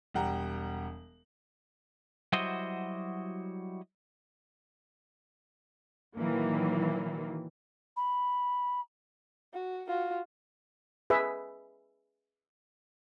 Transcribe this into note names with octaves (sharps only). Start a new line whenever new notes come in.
E1 G3 F#5 G5 A#5
F#3 G3 E4 F#4 C5 D#5
A#2 D#3 E3 F#3 A#3
B5
F#4
F4 F#4
G#4 B4 E5